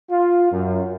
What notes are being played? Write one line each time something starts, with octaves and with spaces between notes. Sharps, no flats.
F4
F#2